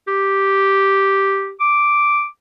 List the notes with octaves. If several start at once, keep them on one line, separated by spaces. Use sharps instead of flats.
G4
D6